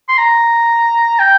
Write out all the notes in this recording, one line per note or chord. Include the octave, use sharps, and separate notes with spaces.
C6
A#5
G5